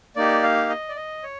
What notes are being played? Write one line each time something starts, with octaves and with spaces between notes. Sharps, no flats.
A#3 D#4 G4 D5
F5
D#5
D5
D#5
C#5